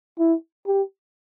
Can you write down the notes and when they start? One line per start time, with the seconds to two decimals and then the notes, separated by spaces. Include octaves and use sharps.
0.19 E4
0.67 G4